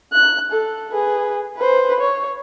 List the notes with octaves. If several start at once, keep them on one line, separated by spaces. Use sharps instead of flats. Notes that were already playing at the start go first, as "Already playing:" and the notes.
F#6
A4
G#4 B4
B4 C5
C#5